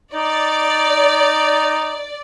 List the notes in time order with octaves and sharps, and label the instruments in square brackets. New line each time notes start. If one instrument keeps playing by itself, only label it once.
[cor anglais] D#4 [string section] D5